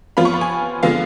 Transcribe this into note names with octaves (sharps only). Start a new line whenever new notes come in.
F3 B3 F4 B5
C#6
B5
G#5
D3 F3 G#3 B3 F5